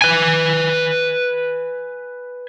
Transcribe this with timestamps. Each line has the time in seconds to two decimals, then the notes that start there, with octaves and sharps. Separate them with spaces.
0.02 B4 G#5